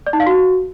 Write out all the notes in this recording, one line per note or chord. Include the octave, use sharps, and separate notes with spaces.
D5
D#4
F5
F#4